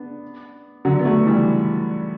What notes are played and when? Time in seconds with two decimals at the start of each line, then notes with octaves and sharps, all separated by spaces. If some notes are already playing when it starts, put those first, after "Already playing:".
Already playing: B3 D4
0.85 D3 F#3
0.99 B3
1.05 F#3 A3
1.26 E3 G3